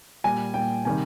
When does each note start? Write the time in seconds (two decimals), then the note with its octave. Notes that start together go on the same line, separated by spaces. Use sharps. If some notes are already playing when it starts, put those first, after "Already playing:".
0.24 A#2 G3 G#5
0.54 A#2 G3 G5
0.85 C3 D#3 G3 G#5